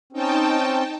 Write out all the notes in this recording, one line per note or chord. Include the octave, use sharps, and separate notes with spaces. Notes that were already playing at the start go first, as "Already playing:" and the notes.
C4 C#4 D#4 G5 A5